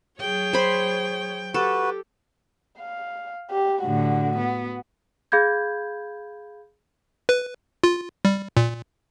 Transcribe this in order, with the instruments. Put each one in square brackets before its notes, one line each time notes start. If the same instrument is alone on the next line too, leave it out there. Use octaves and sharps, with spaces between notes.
[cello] F#3 G5 [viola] G#4 C#5
[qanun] C5 B5 C6
[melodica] F#4 B4 [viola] G4 [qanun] A4
[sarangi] F5
G4
[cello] A2 D3 [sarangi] F#4
[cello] B3
[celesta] G#4 F5 B5 G6 G#6
[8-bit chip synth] B4
F4
G3
A#2